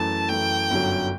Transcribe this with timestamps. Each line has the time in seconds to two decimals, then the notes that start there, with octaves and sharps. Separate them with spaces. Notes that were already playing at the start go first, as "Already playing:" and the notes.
Already playing: F#2 E3 A3 A5
0.29 F#2 E3 A3 G5
0.70 G1 F#2 D3 F#3